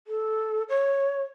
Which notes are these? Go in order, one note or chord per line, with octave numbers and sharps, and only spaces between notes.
A4
C#5